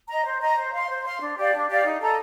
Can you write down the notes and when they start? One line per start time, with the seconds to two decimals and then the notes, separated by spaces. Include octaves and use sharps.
0.09 D#5 A#5
0.24 C5
0.40 D#5 A#5
0.56 C5
0.72 F5 C6
0.89 C5
1.04 F5 C6
1.20 D4
1.37 G4 D5 F5
1.52 D4
1.68 G4 D5 F5
1.84 D#4
2.00 A4 D#5 A#5